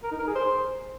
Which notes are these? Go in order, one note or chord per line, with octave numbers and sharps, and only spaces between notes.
A#4
D#4
A#4
G#4
C5